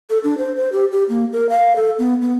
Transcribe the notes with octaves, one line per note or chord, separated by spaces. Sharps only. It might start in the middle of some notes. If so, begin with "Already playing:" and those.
A4
D4
C5
C5
G4
G4
A#3
A#4
F5
A4
B3
B3